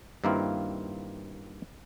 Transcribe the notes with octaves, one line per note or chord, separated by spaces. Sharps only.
G2 D#3 A#3 C4 E4 F4